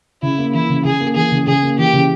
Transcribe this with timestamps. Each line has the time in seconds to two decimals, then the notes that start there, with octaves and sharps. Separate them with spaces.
0.23 C#3 E4
0.38 A#3
0.54 E3 E4
0.69 C#3
0.85 C#3 G#4
1.00 A#3
1.16 E3 G#4
1.32 C#3
1.47 C#3 G#4
1.63 A#3
1.79 E3 G4
1.93 C#3